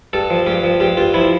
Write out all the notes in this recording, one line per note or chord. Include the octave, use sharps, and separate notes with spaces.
G2 A4
F3
G2 G4
F3
G2 G4
G2 F4
F3 E4